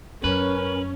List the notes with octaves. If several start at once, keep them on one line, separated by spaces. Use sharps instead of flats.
F#2 C#4 A#4 B4